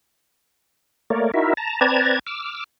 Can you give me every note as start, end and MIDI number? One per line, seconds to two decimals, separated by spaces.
1.10 1.31 57
1.10 1.31 58
1.10 1.31 70
1.10 1.31 73
1.10 1.31 74
1.34 1.54 63
1.34 1.54 64
1.34 1.54 66
1.34 1.54 70
1.34 1.54 76
1.57 1.80 81
1.57 1.80 82
1.81 2.19 60
1.81 2.19 71
1.81 2.19 74
1.81 2.19 81
1.81 2.19 82
1.81 2.19 92
2.27 2.64 86
2.27 2.64 88
2.27 2.64 89